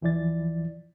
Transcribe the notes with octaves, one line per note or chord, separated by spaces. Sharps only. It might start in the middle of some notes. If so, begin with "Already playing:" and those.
D#2 E3 F3 E4 D5 A6